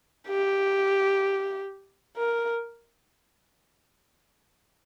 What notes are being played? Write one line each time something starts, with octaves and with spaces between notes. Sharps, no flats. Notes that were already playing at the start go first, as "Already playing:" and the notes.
G4
A#4